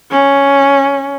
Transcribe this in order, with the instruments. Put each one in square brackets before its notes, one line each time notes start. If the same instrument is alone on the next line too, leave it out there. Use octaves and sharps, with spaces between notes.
[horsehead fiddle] C#4